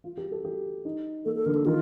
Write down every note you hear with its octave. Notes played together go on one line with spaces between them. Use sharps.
F4
G4
A4
G4
D#4
A#3 A4
A4
D3 A#4
A4
D#3 F4